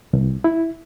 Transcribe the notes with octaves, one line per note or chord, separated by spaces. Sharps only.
C2
E4